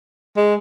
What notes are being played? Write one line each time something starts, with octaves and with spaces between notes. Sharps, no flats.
G#3